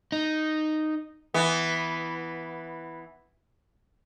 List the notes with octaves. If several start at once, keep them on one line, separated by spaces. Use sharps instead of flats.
D#4
E3 B3